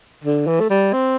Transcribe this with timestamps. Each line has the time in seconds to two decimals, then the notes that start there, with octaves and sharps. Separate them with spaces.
0.24 D3
0.47 E3
0.60 A3
0.70 G3
0.93 C4